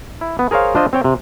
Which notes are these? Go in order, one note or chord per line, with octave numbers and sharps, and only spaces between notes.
E4
B3
G#4 A#4 C5 C#5 F5
D4 F4 C5 D#5
C4 C#5 G5
C3